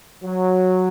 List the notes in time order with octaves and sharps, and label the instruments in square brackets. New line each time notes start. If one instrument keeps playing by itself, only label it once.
[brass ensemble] F#3